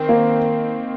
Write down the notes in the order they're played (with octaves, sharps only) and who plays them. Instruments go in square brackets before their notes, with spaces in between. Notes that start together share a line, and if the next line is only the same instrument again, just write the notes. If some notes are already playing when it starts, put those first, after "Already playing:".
Already playing: [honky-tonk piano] D#3 C4
[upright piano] A#3